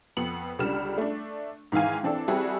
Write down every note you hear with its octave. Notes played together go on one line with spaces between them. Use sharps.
F2 B3 C#7 F#7
C#2 D3 G3 F6 E7
A3 D4
G#2 D#3 E3 F5 G#5
E3 C4 D4 A4
G3 C4 E4 F#4 G#4 A4